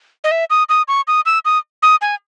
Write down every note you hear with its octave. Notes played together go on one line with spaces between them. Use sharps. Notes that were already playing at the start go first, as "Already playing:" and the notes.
D#5
E5
D#6
D#6
C#6
D#6
E6
D#6
D#6
G#5